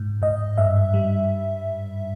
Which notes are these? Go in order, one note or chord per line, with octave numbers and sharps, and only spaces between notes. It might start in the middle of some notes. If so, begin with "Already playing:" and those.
Already playing: G#2
G#2 D#5
G2 E5
G3